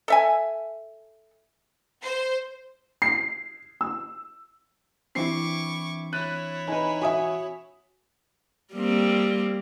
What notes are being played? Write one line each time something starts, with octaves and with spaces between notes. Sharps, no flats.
A4 E5 G#5
C5
C7
E6
E3 C4 D4 E4 C#6 D6 C7
E4 C#5 F#6 A6 D#7
D#4 B4 G#5
F#4 E5 G#5 D#6
G3 A#3 C4